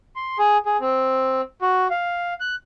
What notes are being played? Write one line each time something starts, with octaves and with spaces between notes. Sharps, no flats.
C6
G#4
G#4
C4
F#4
F5
F#6